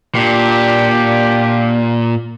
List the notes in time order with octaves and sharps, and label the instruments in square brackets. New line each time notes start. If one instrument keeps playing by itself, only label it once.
[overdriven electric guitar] A#2 [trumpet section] D4 G4